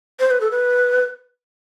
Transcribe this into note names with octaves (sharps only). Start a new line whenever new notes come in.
C5
B4
A4
B4